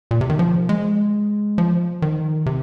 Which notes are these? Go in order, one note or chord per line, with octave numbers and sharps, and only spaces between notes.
A#2
C3
D#3
F3
G#3
F3
D#3
C3